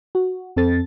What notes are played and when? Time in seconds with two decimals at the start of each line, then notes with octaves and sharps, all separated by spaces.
0.15 F#4
0.56 F2 C4 A4 A6